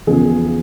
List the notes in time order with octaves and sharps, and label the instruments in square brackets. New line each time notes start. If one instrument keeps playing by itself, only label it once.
[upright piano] E2 C#3 F3 G#4